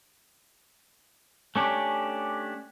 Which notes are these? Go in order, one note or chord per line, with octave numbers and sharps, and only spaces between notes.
A3 C#4 D4 G4